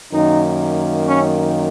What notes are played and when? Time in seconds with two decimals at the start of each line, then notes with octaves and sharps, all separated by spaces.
0.12 F#2 D#3 A#3 D#4
1.06 C#4